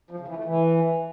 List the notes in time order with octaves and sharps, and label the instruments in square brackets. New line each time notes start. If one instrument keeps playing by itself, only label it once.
[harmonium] F3
C#3
E3
A3
E3